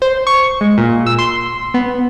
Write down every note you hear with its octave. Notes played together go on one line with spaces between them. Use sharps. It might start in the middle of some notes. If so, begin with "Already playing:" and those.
C5
C#6
G#3
A#2
E6
C6
B3